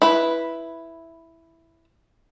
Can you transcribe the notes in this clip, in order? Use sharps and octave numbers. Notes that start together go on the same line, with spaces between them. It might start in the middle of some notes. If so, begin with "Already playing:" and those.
E4 B4